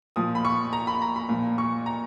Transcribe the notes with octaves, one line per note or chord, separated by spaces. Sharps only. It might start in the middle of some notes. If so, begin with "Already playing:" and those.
A#2 F3 D#6
B5
C#6
A#5
B5
A#5
B5
A#2 F3
C#6
A#5